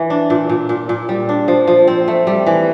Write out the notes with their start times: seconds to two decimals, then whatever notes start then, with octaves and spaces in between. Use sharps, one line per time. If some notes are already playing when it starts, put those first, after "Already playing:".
Already playing: E3
0.10 D4
0.30 A#2
0.49 A#2
0.69 A#2
0.89 A#2
1.09 G3
1.29 D4
1.48 F3
1.67 F3
1.87 C4
2.08 A3
2.27 G3
2.47 E3